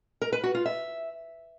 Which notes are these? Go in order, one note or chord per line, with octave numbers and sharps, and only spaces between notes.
A#4
B4
F#4
F4
E5